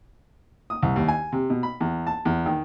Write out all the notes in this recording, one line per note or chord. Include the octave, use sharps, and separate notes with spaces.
D#6
C2
D#2
G#5
C3
B2
B5
E2
A5
E2
D#3